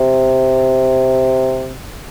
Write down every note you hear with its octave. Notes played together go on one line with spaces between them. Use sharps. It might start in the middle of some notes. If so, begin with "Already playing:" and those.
Already playing: C3